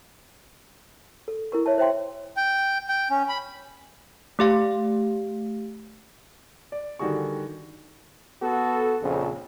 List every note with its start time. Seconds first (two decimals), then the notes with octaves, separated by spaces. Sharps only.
1.28 A4
1.52 E4 A#4 C#6
1.66 C#5 E5 A5
1.78 C5 E5 G5 C6
2.37 G5
2.89 G5
3.10 C#4
3.29 B5
4.39 A3 G4 F5
6.72 D5
6.99 D3 D#3 G3 F#4 G#4 C#6
8.43 B3 F#4 A4
9.02 A#1 F2 C#3